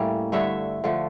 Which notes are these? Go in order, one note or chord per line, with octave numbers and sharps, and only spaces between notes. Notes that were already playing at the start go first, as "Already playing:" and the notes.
Already playing: A2 G3 A#3 C#4
G2 D3 A3 C#5 E5
D3 F3 A3